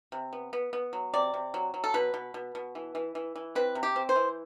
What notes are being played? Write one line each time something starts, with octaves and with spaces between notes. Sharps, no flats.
C3
B3
B3
B3
F#3
C3 D5
C3
F#3
F#3
A4
B2 B4
B2
B2
B2
E3
E3
E3
E3
C4 B4
C3
G4
C4
C5
E3